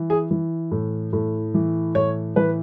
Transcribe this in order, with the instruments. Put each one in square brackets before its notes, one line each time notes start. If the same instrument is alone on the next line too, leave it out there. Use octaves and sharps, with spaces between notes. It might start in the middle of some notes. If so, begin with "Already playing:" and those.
Already playing: [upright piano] E3
G#4
E3
A2
A2
E3
A2 C#5
E3 B4